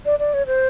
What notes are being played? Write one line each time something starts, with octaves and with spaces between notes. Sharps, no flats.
D5
D5
C#5
C5